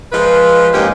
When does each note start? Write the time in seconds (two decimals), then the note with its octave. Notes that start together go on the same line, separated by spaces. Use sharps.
0.12 F3 G#3 F4 B4
0.73 G#2 A#3 C#4 D#4 G4